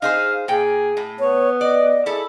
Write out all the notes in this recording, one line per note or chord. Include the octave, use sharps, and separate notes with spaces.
D#4 G#4 C5 F5
A#2 G#4 G5
A2
B3 C#5
D5 D#5
E4 G#4 A4